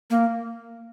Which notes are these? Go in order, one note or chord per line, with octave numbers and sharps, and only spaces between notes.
A#3